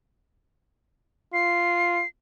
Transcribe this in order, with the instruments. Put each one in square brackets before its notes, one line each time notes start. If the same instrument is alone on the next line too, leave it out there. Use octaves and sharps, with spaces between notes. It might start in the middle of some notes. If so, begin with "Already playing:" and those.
[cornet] F4 [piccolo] C7